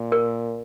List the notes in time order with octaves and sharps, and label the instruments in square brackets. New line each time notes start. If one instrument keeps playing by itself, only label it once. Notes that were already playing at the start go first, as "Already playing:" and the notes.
Already playing: [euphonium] A#2
[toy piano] A#4